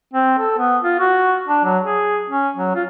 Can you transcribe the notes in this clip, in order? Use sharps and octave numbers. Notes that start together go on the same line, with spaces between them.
C4
A4
B3
F4
F#4
D4
F#3
G#4
C#4
F#3
F4